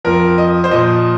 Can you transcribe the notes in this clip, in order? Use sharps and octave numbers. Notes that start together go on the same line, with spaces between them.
F2 F3 A#4
D#5
C5
A#2 F3 D#5